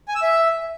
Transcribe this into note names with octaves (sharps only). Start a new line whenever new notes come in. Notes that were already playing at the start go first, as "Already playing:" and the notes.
G#5
E6
E5